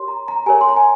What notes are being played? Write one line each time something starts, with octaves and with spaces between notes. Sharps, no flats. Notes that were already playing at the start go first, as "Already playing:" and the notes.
Already playing: G4 A#4 C#5 C6
A#5
A#5
G4 A#4 C#5 G#5
C6
A#5
G#5